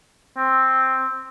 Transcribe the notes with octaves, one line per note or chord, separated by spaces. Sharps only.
C4